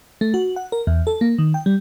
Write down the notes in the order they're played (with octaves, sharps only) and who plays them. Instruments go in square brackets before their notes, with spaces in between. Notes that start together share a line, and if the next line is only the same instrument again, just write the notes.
[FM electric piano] A3
F#4
F#5
A#4
E2
A4
A#3
D#3
G5
G3